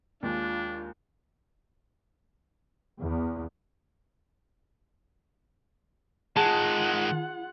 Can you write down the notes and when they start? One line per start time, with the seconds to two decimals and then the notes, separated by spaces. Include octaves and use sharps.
0.23 D#2 G#3 D4 F4
3.00 E2
6.37 D#3 G#3 F4 G#4 F#5 A5